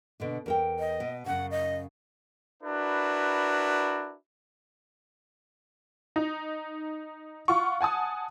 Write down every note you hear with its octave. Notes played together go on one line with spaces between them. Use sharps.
B2 D3 D4
E2 A#4 G5
D#5
B2
F#2 C#3 F#5
D#5
D4 E4 F#4 A#4 B4
D#4
F4 F#5 C#6
F#5 G#5 A5 D#6